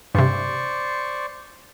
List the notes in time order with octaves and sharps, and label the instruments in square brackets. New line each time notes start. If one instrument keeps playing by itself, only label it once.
[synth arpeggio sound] G2 C3 [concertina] C5 D5 C#6